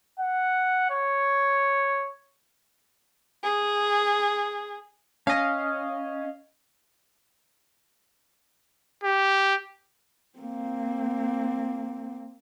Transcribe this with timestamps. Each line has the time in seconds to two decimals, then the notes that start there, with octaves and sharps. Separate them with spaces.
0.20 F#5
0.90 C#5
3.45 G#4
5.27 C#4 D#5 F5
9.04 G4
10.38 A#3 C4